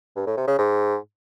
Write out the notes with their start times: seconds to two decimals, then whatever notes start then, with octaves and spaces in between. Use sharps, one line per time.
0.16 G2
0.26 A2
0.37 C3
0.48 C#3
0.58 G#2